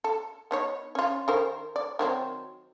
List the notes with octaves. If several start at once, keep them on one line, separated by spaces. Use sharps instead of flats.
A4
B3 D#4 C#5
C#4 F4
D#3 A#4 C5
D5
D#3 F#3 C4